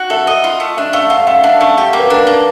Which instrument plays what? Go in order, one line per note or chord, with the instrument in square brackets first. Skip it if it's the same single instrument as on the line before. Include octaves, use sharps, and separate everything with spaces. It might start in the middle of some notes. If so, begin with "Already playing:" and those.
Already playing: [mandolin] F#4
[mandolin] A4 [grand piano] E5
[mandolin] D#5
F4
A3
[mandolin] D4 [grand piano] E5
[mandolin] A3 [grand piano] F5
[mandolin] F4 [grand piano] F#5
[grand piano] F5
[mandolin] A3 [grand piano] E5
[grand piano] F5
[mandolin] D4
A3
[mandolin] G4 [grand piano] F#5
[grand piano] F5
[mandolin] A#3
[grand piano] B4
[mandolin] D4 [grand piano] A#4
[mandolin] A#3